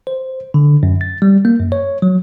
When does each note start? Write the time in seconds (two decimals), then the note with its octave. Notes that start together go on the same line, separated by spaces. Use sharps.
0.07 C5
0.54 D3
0.83 F#2
1.01 A6
1.22 G3
1.45 A#3
1.59 F#2
1.72 C#5
2.02 F#3